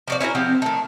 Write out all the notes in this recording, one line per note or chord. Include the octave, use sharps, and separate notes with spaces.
F3 F#4 D5
C#4 E4 F#4 A#4
F3 C4 G4 F#5
D#3 A3